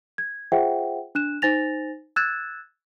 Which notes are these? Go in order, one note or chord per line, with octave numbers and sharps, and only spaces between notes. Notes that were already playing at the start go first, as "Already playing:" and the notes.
G#6
F4 G#4 C5 E5 F#5 G5
D4 F#6 E7
D#4 C5 G#5 A6 A#6 F7
E6 F#6 G#6 A6 E7